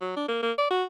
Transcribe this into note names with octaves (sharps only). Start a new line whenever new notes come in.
F#3
D4
A#3
A#3
D5
F#4